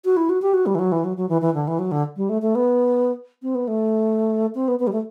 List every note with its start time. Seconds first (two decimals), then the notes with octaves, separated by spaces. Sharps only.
0.05 F#4
0.17 E4
0.29 F#4
0.42 G4
0.54 F#4
0.66 G3
0.75 E3
0.79 F#3
0.92 E3
1.04 F#3
1.17 F#3
1.29 E3
1.41 E3
1.54 D3
1.68 E3
1.79 F#3
1.92 D3
2.16 G3
2.29 A3
2.42 A3
2.55 B3
3.42 C4
3.55 B3
3.68 A3
4.55 C4
4.68 B3
4.80 B3
4.87 G3
4.92 A3